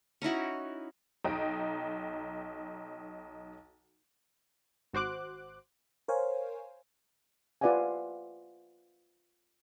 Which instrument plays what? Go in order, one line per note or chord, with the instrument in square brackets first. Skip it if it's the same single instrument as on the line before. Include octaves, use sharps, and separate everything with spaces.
[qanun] C#4 D#4 E4 F#4
[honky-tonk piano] B1 D#4 D#5 G5 D7
[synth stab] G#1 F#4 C5 D6 F#6
[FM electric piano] A#4 C5 C#5 F5 G#5
[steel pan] F4 B4 D5 E5 F#5 G#5